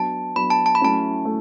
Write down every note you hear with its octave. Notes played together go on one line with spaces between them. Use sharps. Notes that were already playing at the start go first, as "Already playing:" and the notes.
Already playing: F#3 B3 D4 A5
F#3 B3 D4 B5
A5
A5
B5
F#3 A3 C#4 E4 A5
F#3 A3